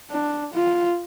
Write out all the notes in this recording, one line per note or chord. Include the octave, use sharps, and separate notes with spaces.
D4
F4